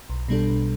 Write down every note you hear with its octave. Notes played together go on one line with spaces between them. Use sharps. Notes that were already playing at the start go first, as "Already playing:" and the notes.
B1
B2 G3 D4 A4
B1